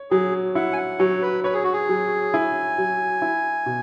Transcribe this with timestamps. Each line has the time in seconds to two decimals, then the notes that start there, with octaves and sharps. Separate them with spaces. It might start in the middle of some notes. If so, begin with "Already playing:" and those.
Already playing: C#5
0.11 F#3 G#4
0.55 E4 F#5
0.73 G#5
0.78 F#5
0.99 F#3 C#5
1.22 B4
1.44 B4 C#5
1.54 G#4
1.64 F#4
1.73 G#4
1.89 F#3
2.33 E4 G#5
2.78 F#3
3.22 E4
3.66 B2